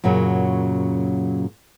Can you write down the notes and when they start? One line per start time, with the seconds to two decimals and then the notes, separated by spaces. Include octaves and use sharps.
0.04 F#2 A#2 C#3 F#3